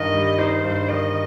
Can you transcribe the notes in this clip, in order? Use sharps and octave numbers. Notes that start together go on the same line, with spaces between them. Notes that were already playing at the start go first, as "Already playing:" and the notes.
Already playing: G2 D#3 D#4 D#5
G3
D#4 C5
G2
D#3 D#5